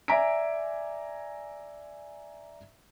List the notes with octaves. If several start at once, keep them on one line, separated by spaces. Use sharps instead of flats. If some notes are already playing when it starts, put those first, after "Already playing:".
D5 E5 G#5 A#5 B6 D7